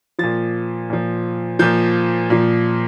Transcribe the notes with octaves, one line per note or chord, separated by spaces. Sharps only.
A#2 F3 A6
A#2 F3
A#2 F3 G6
A#2 F3